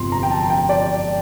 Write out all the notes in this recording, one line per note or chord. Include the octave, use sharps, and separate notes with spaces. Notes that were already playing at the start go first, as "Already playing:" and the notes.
Already playing: G1 F2 C3 F3 C6
A#5
G5
A5
G5
D5